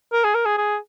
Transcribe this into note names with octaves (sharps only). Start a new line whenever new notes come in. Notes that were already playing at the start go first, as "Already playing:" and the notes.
A#4
G#4
A#4
G#4
G#4